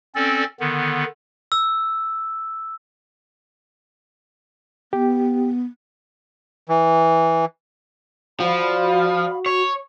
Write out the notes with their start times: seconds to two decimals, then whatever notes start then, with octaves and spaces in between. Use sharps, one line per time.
0.15 C4 C#4 A4 D5
0.60 D3 D#3 B3
1.52 E6
4.93 B3 G4
6.69 E3
8.40 F3 F#4 D5 F5 B5
9.46 C#5